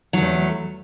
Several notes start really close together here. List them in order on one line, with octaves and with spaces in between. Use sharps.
F#3 E2 A3